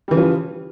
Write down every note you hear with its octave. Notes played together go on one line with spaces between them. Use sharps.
C#3 E3 F3 G3